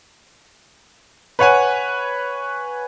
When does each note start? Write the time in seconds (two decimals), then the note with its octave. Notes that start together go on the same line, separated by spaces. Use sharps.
1.39 B4 C#5 F#5 G#5